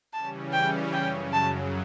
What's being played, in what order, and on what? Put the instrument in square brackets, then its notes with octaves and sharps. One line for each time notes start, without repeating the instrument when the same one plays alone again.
[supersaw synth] C#3 E3 G3 C#4 [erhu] A5
[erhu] G5
[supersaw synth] F#2 C#3 F#3 [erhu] G5
[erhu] A5